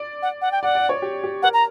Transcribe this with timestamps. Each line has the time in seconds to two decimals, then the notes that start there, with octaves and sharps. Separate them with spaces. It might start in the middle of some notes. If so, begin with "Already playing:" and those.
Already playing: D5
0.22 F#5
0.42 F#5
0.52 G5
0.63 D5 F#5
0.75 D5
0.89 C#5
1.02 G4
1.24 G4
1.43 A#4 F#5
1.53 A#5